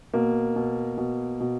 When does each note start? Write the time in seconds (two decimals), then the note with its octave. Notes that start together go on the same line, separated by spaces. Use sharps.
0.14 B2 A#3
0.56 B2
0.98 B2
1.40 B2